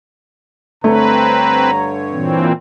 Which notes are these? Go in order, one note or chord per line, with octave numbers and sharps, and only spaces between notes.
G2 D3 A3 C4 B4 C#5 A#5
A#2 E3 C4